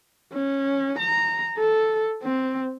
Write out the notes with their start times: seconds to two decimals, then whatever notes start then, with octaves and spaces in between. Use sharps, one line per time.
0.33 C#4
0.98 A#5
1.58 A4
2.23 C4